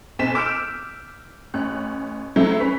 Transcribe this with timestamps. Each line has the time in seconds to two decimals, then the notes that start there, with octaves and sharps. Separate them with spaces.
0.19 B1 C4 B6 E7
0.35 D6 E6 F6 G6 D7 E7
1.54 A1 C#4 F#6
2.36 F#3 A3 C4 E4
2.60 C#4 B4 B6